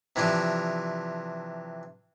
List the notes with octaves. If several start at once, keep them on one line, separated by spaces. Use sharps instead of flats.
C3 E3 F3 D4